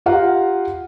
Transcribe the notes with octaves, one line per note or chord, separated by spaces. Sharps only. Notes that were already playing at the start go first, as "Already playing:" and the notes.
F4 G4 F5 F#5 A#5